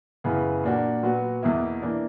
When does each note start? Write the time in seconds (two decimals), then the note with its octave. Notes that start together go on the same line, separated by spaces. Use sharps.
0.24 F#2 C#3 E3 B3
0.64 A#2 A#3 D4 F#4
1.03 A#2 F#3 B3 F#4
1.43 E2 B2 A#3 E4
1.82 E3 A#3 D4